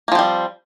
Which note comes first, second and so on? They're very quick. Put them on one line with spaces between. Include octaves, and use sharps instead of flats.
A#3 F3 C4 G3